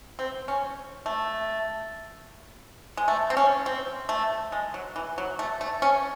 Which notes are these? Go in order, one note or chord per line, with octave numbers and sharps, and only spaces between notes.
C4
C#4
A3
G#3
A3
C4
C#4
C4
A3
G#3
F#3
E3
F#3
A3
A3
C#4